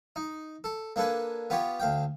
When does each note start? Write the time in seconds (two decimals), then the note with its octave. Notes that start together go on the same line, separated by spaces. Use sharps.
0.16 D#4
0.64 A4
0.96 A#3 D4 A4 B4 G#5
1.50 B3 F4 G4 C#5
1.80 D2 F5 G5